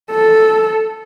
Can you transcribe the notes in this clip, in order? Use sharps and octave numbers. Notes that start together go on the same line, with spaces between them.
A4